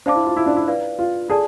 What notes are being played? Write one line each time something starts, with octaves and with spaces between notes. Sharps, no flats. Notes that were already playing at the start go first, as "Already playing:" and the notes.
D4 C5 F5 A5 D6
E4
F4
E4
D4
E4
B4 D5 F5
F4
F4 G#4 A4 D5 A5